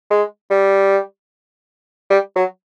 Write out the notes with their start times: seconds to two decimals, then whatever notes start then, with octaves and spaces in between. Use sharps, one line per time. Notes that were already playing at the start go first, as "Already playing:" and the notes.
0.11 G#3
0.50 G3
2.10 G3
2.36 F#3